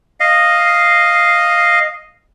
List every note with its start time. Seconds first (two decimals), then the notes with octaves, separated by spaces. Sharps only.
0.20 D#5 F5